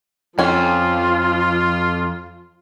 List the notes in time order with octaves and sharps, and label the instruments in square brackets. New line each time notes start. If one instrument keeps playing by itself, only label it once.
[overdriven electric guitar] F2 [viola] F3 [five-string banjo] C#4 G#5 [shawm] F4